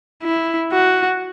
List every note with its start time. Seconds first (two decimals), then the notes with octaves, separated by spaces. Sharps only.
0.23 E4
0.72 F#4